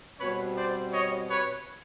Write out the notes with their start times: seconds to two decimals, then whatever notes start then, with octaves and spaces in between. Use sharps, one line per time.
0.20 B2 G3 C4 B4 C#5
0.56 C5 D5
0.93 C#5 D#5
1.30 B4 C#5